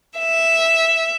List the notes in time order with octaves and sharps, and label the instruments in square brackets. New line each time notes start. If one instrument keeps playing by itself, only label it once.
[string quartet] E5